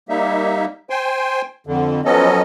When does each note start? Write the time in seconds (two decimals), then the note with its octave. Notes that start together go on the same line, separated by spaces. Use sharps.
0.09 G3 A#3 D#4 E5
0.90 C5 G5 G#5 C6
1.67 F2 D3
2.05 F3 F#3 B3 C#4 A4 D#5